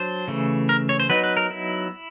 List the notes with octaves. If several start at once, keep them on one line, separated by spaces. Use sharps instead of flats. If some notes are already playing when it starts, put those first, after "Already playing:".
Already playing: F#3 D4 C5
C#3 E3 A3
A#4
C#5
C5
F#3 B3 D#4 B4
B4
A#4
E4